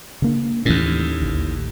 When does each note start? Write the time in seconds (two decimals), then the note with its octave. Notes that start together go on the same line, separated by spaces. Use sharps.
0.22 C#3 A#3 D4
0.65 D#2 A2 E3 A#3 C#4
1.22 A1 D2